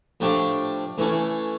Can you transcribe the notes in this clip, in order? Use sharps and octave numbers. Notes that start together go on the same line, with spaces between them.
A2 F3 A3 D4 G4
A2 E3 A3 C#4